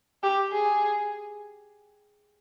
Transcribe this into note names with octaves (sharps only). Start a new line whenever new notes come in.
G4
G#4